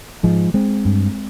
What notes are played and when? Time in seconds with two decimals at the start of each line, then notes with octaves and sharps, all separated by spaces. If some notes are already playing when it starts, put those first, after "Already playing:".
0.23 G#2 F3 G#3
0.54 G#3 C4
0.85 G2